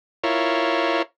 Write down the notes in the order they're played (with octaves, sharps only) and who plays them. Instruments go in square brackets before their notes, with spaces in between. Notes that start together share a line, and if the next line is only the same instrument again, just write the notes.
[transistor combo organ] E4 F4 A#4 C#5